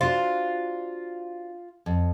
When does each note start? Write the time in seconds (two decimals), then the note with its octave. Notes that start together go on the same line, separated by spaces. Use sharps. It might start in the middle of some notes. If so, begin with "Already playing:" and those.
0.01 D4 F4 F#4 C5
1.86 F2